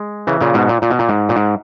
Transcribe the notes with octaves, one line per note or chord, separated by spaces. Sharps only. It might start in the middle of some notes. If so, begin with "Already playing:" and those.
Already playing: G#3
C#3 E3
A#2 C#3
G#2 B2
A#2
A#2
B2
A#2
G#2
A#2
G#2